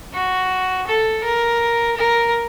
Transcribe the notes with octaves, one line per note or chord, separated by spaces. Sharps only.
F#4
A4
A#4
A#4